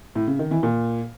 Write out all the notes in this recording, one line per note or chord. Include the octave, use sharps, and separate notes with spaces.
A2
C#3
D#3
E3
A#2